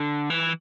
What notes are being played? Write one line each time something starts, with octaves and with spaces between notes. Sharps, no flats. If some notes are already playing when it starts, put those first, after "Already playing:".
Already playing: D3
E3